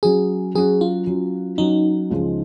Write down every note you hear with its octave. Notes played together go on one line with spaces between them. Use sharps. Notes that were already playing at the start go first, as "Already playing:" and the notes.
F#3 C#4 F#4 G#4
F#3 C#4 F#4 G#4
F4
F#3 C#4 F#4
F#3 C#4 D#4 F#4
C#2 C#3 F3 G#3